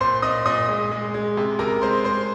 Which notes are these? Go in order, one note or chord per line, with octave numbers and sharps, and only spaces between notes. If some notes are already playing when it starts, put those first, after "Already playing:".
A#2 C5 C6
A#2 D#5 D#6
A#2 D#5 D#6
G#3
G#3
G#3
C3
C3 A#4 A#5
G#3 C5 C6
G#3 C5 C6